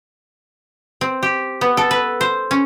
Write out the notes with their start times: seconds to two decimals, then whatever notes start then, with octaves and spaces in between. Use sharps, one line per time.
1.01 C4
1.23 G4
1.61 B3
1.77 A4
1.91 B4
2.21 C5
2.51 C#4